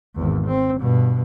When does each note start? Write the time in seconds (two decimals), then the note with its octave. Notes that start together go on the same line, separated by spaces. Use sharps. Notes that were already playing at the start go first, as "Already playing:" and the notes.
0.16 G#1 E2
0.47 C4
0.79 G2 B2